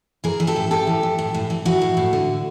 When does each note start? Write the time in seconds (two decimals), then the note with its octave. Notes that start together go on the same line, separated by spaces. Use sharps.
0.24 E3 G#4 A#4
0.40 E3
0.47 G4 A4
0.56 A2
0.71 A2 G4 A4
0.87 E3
1.03 E3
1.19 A2
1.34 A2
1.50 E3
1.65 E3 E4 F#4
1.82 A2
1.97 A2
2.13 D3